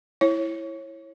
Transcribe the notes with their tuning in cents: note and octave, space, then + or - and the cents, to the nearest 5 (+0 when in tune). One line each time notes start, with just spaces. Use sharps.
E4 +0 C#5 -25